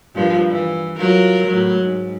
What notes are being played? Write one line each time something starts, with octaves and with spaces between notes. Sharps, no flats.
G2 A#2 F3
E3
F#3 F4 A#4
A2 F#3
G#2